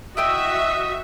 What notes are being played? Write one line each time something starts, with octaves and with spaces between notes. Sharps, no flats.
E4 F#4 D#5 E5 G5 E6